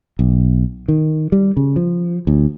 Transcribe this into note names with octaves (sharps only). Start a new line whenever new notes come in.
B1
D#3
G3
C#3
F3
D2